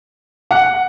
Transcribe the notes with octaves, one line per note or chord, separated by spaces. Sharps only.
F#5